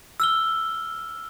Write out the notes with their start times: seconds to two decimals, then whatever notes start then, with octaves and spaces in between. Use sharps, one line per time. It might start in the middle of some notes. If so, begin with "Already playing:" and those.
0.20 E6 F6 G7